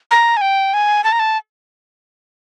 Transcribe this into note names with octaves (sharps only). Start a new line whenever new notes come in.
A#5
G#5
G5
G#5
A5
A#5
A5